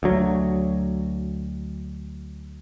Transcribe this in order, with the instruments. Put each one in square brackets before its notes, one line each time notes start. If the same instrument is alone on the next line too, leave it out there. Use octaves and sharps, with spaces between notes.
[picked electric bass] D2 F#3